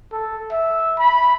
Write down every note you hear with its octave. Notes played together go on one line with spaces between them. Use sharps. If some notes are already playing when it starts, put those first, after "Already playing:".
A4
E5
B5